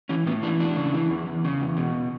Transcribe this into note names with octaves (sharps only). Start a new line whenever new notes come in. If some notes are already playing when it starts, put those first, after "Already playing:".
E3 C#4
A2 B3
E3 D4
E2 D4
C#3
E3
E2
E2
C#3
E2
B2